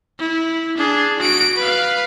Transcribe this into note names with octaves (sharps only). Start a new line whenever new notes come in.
E4
D4 G#4
F#4 D7
B4 F5